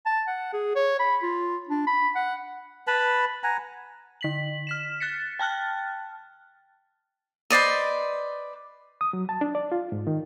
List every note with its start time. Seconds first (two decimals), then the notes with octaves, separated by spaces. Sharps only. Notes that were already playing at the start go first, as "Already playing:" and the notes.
0.06 A5
0.28 F#5
0.53 G#4
0.76 C#5
1.00 B5
1.23 F4
1.69 D4
1.87 B5
2.16 F#5
2.87 B4 A5 B5
3.44 F#5 G#5 A#5
4.21 D3 B6 F#7
4.67 F6 B6 E7
5.00 F#6 A6 B6 C#7
5.39 G5 A5 F6 F#6 A6
7.50 B4 C5 D5 D#5
9.01 D#6
9.13 F#3
9.29 A5
9.41 D4
9.55 D5
9.72 F4
9.92 G#2
10.07 D#3